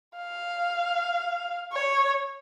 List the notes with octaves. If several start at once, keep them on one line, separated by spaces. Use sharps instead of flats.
F5
C#5